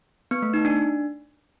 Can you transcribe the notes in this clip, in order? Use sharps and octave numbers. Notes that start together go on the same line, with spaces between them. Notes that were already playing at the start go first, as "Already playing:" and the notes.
B3
A3
D#4
D4